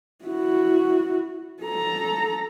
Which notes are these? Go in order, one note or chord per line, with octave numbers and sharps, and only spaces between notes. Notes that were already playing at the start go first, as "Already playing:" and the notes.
E4 F#4
A4 A#5